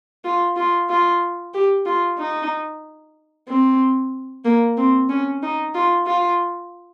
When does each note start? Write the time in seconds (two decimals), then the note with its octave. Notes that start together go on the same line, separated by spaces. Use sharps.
0.24 F4
0.56 F4
0.89 F4
1.54 G4
1.85 F4
2.18 D#4
3.48 C4
4.44 A#3
4.77 C4
5.09 C#4
5.42 D#4
5.74 F4
6.06 F4